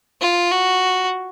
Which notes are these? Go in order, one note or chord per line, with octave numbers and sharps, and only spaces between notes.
F4
F#4